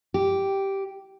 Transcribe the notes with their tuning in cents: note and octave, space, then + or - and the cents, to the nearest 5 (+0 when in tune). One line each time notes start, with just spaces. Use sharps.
G4 -5